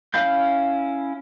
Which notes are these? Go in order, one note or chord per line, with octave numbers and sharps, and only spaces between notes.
C#4 E4 F5 B5 G6